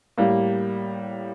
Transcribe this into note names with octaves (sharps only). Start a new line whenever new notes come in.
A2 G3 A#3